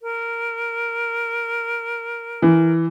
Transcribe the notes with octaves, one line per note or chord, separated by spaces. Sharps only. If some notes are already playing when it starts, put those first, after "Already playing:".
A#4
E3